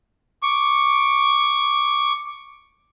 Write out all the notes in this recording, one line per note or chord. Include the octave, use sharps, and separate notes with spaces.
C#6 D6